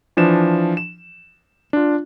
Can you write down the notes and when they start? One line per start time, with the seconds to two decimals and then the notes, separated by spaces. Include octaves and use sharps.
0.17 E3 F3 D4 E7
0.77 E7
1.73 D4 F4